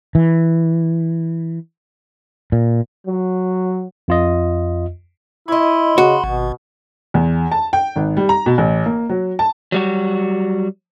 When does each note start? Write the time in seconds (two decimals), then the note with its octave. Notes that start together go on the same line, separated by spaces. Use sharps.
0.15 E3
2.52 A#2
3.07 F#3
4.08 F2 F4 D#5
5.48 E4 C#5 D#5 B5 C6
5.98 C#3 F#4
6.24 G#1 B2
7.14 E2
7.51 A5
7.73 G5
7.96 G#1
8.17 G3
8.29 A#5
8.46 B2
8.58 A1
8.86 A#3
9.09 F#3
9.39 A5
9.72 F#3 G3 F#4